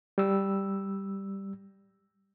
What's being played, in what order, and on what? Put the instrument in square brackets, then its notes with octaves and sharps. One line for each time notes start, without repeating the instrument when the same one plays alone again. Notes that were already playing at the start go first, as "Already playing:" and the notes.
[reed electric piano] G3 E6